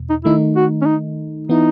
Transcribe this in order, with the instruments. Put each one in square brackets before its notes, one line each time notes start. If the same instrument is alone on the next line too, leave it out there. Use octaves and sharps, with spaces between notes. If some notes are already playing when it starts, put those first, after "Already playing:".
Already playing: [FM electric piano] E2 B2
[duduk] D#4
[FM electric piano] D#3 A3 D#4 [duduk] E4
[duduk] F#4
C#4
D#4
[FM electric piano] E3 B3 E4 [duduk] D#4